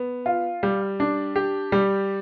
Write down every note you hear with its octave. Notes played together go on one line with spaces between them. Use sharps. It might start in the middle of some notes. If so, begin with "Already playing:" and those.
Already playing: B3
F4
G3
D4
G4
G3